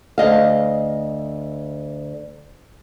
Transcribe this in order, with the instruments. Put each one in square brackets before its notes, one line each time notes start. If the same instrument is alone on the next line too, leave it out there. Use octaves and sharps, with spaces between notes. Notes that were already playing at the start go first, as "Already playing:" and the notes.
[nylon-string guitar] D2 D#5 F5